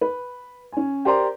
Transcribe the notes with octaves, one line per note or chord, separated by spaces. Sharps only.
B4
C#4 G#5
G4 A#4 C5 D5 A#5 C6